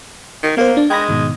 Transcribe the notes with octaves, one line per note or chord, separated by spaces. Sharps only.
D#3
A#3 B3 A#4 C5
D4
G#3 G5 B5 A#6
G#2 B2 D#3